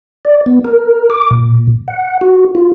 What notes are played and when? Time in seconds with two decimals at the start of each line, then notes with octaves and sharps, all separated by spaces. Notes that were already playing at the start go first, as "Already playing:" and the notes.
0.25 D5
0.46 B3
0.64 A#4
1.10 D6
1.31 A#2
1.88 F#5
2.21 F#4
2.55 F4